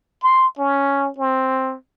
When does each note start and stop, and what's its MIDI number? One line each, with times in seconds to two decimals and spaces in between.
0.23 0.47 84
0.59 1.10 61
1.18 1.75 60